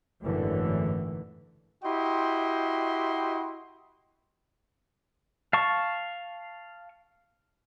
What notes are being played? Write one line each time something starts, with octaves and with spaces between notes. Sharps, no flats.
G#1 F#2 A2 D3 E3
E4 F#4 G4 D#5 G5 C6
F5 A5 C#6